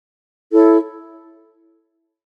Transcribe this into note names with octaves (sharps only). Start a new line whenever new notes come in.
E4 A4 C#5